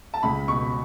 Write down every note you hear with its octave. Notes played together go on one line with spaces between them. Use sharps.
A5
C#2 B5
B2 C#6